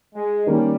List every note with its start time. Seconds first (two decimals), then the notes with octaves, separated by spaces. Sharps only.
0.14 G#3
0.47 D#3 G3 A#3 C#4